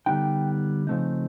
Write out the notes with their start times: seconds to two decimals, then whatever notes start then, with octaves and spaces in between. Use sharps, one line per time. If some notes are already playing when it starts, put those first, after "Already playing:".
0.06 D3 G3 B3 D#4 G5
0.87 C#3 F3 A3 C4 D#4